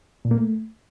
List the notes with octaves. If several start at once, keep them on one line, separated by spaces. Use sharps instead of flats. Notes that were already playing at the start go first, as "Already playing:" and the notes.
A#2
A#3
A3